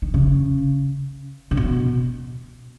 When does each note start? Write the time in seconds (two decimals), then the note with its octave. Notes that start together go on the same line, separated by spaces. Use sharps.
0.02 D#3
0.14 C#3
1.51 C#3
1.57 B2